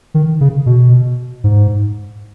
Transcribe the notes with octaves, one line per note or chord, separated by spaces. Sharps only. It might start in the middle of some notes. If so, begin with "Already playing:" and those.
D#3
C#3
B2
G#2